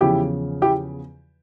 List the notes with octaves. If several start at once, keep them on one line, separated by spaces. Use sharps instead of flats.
E2 C#3 F3 E4 G4
E4 G4